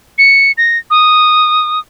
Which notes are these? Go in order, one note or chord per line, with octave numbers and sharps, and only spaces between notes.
C#7
A#6
D#6